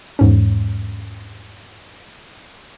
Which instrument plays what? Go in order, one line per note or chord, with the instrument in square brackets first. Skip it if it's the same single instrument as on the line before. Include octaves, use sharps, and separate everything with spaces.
[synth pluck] E2 G#2 C#4